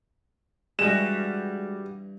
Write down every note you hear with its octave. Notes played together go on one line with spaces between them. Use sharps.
G2 E3 G3 G#3 F#4 G#4 E7